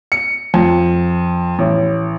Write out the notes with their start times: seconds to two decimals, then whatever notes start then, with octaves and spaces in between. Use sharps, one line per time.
0.12 C#7
0.54 F2
1.59 A1